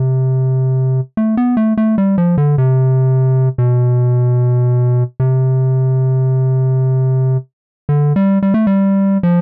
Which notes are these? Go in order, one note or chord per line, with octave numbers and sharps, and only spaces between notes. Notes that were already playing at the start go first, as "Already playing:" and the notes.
Already playing: C3
A3
B3
A3
A3
G3
F3
D3
C3
B2
C3
D3
G3
G3
A3
G3
F3